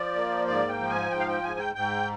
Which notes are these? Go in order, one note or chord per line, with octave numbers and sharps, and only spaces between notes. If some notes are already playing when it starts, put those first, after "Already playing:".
Already playing: F3 D5
A#3
G#2 D5
G5
F3
G#5
G#2 G5
F5
G5
G#2 G#5
G5
G#2 G5